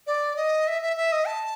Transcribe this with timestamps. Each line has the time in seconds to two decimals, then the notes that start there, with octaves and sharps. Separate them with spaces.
0.07 D5
0.36 D#5
0.67 E5
0.82 E5
0.97 E5
1.12 D#5
1.27 A5